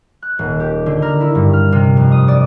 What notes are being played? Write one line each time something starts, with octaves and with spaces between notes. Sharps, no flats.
F#6
D#1
G4
D3
A#4
E4
G2
F6
C3
F2
D#6
D5